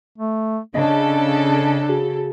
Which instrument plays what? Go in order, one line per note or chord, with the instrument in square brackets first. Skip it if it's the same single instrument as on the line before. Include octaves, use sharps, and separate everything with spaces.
[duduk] A3
[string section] C#3 A4 [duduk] D4 [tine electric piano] D#5
[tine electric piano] F#4 G#4